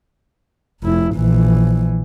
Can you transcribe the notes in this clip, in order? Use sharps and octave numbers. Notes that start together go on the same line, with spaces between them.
F1 E4
A#1 E3